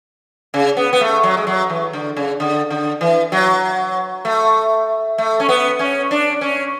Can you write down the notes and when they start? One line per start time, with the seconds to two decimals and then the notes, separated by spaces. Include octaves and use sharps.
0.54 C#3
0.77 B3
0.93 B3
1.01 A3
1.23 F#3
1.37 G#3
1.47 F#3
1.69 E3
1.93 D3
2.17 C#3
2.40 D3
2.71 D3
3.01 E3
3.32 F#3
4.25 A3
5.18 A3
5.40 C#4
5.49 B3
5.79 C#4
6.11 D4
6.41 C#4